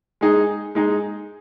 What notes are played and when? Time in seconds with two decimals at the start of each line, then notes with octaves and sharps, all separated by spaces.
0.21 G#3 D#4 G#4
0.75 G#3 D#4 G#4